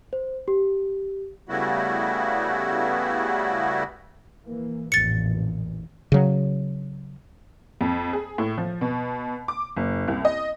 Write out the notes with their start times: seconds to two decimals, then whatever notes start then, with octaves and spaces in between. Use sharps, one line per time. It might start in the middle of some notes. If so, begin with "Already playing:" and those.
0.13 C5
0.48 G4
1.49 C#3 G3 A3 B3 E4 F#4
4.44 E3 A#3
4.92 A1 F2 A#2 A6 C#7
6.12 C#3 F#3
7.81 F2
8.13 G#4
8.38 A2
8.58 F3
8.81 B2
9.48 D6
9.77 F#1
10.08 C2
10.25 D#5